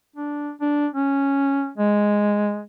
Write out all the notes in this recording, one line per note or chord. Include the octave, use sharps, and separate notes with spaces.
D4
D4
C#4
G#3